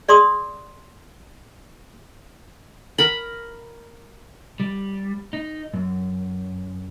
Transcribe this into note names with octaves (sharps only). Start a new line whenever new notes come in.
G#4 D5 C6 D#6
A#4 A#5 B5
G3
D#4
F#2